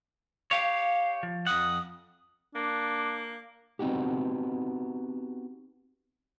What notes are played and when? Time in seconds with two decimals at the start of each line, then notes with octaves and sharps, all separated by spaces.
0.51 G4 C#5 F5
1.23 F3
1.47 F2 F#5 D#6
2.55 A#3 D4
3.79 B3 C4 D#4 F#4 G4